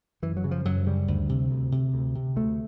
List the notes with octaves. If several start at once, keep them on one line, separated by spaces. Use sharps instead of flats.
F#2 E3
F#3
C#3
F3
F#2 F#3
C#3 G3
D2
C3
D2
C3
D2
C3
D2 A3